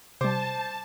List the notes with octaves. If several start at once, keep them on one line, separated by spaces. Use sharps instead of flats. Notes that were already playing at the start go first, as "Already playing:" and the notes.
C3 G3 C5 A5 D6